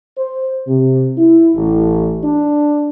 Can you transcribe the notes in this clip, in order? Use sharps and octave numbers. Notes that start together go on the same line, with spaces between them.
C5
C3
E4
A1
D4